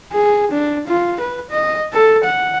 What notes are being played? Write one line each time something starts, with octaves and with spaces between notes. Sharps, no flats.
G#4
D4
F4
B4
D#5
A4
F#5